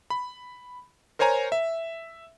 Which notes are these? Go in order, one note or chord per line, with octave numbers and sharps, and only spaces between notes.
B5
A#4 C5 C#5 G#5 A#5
E5